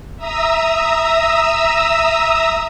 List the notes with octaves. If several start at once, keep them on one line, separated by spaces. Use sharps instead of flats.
E5 A#5 D#6 E6